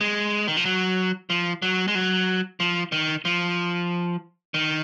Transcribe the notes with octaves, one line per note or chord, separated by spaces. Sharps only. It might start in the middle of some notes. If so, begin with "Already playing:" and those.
G#3
D#3
F3
F#3
F3
F#3
G#3
F#3
F3
D#3
F3
D#3